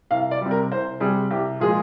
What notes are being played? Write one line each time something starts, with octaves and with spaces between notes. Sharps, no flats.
C2 F5
D5
C3 G3
A#4
C2 C5
C3 G3 G#4
C2 G4
A#2 F3 G#3 G#4